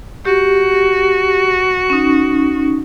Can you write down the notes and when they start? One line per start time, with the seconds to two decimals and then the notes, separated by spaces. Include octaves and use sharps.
0.25 F#4 G4
1.90 C#4 D#4